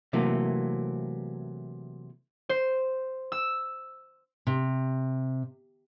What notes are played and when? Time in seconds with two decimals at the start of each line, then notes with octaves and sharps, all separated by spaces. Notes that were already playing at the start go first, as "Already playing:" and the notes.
0.13 C3 E3 F#3 A3 A#3
2.49 C5
3.32 E6
4.47 C3